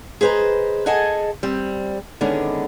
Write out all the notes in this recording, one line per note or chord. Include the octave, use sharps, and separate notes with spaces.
G#4 B4 C5 D#5 A#5
G#4 A4 D#5 F#5 G#5 A5
G3 C4
D3 D#3 G#3 B3 C#4 D4